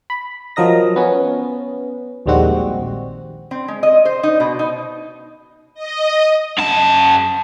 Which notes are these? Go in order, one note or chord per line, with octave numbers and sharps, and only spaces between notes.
B5
F3 F#3 A#4 D#5 A#6
B3 C#4
A#1 D#2 G3 G#3 C4 F#4
C4
G#3
D#5
C5
D#4
B2
D#4
D#5
F#2 A5